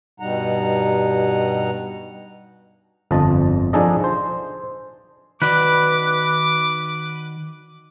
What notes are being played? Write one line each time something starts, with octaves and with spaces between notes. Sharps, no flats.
G2 B2 G3 D#4 F#5 A#5
G1 F2 F3 D#5 A5
F3 D4 D#4 G#4 A4 D#5
C5
D#3 F#4 B4 D5 D6